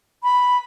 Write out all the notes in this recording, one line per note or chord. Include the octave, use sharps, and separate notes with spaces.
B5